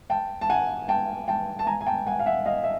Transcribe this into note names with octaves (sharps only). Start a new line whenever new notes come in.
G5 A5
A5
F#5 G#5
G5 A5
G5 A5
A5
G#5 A#5
G#5
G5 A5
F#5 G#5
F5
E5 F#5
D#5 F5
E5